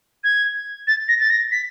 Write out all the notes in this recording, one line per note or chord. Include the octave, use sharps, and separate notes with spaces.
G#6
A6
A#6
A6
A#6
B6